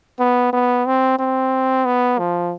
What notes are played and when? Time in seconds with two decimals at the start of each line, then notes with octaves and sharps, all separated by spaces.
0.19 B3
0.53 B3
0.86 C4
1.19 C4
1.85 B3
2.19 F3